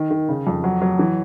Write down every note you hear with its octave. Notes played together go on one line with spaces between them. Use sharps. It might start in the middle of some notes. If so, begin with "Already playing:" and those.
Already playing: D#3
D#3
C#3
F2
F#3
F#3
E3